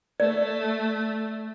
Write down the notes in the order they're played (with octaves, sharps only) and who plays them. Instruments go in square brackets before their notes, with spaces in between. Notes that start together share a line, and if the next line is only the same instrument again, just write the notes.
[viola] A3 [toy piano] D5